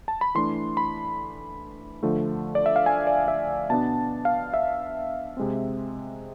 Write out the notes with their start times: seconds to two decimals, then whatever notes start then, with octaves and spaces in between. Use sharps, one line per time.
0.08 A5
0.21 B5
0.35 E3 A3 D4 C6
0.77 B5
2.03 D3 F3 A3
2.55 D5
2.66 E5
2.76 F5
2.86 G#5
3.07 D5
3.28 E5
3.70 B2 B3 D4 A5
4.25 F5
4.54 E5
5.37 C3 G#3 C4